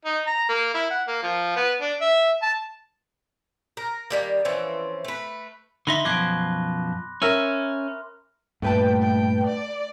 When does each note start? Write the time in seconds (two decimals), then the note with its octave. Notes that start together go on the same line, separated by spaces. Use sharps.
0.05 D#4
0.26 A#5
0.49 A#3
0.74 E4
0.91 F#5
1.07 A#3
1.23 F3
1.56 B3
1.81 D4
2.01 E5
2.42 A5
3.77 A#4
4.10 D#3 G3 A#3
4.45 E3 F3 C4 C#4
5.05 A3 B4
5.87 D3 D#4 E5 B5 C6 A#6
6.05 F#2 B2 F3 C6 D6 F#6 G#6 D7
7.22 C#4 A#4 E5 F6
8.62 G2 A#2 A3 B4 G5 A5
9.01 G5
9.46 D5